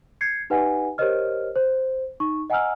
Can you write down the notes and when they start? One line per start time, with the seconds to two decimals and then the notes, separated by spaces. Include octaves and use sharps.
0.21 G6 G#6 C7 C#7
0.50 D#4 G4 B4 D#5 F#5 G#5
0.98 G4 A#4 C5 C#5 D#5 F6
1.56 C5
2.20 D#4 C#6
2.50 D#5 F#5 G#5 A#5 E6 F6